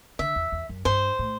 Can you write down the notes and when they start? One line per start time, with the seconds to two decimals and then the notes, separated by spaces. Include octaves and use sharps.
0.19 D3 E5
0.36 E2
0.52 E2
0.69 F#2
0.85 G2 C5
1.19 A2